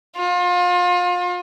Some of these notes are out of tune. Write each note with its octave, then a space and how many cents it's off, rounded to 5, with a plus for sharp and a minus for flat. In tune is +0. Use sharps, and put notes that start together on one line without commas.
F4 +35